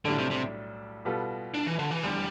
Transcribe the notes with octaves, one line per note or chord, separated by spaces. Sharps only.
B1 A2 D3 G3 D4 A4
C3
C3
B2 G3 B3 F4 A4
D4
E3
D3
E3
F1 E2 D3 G3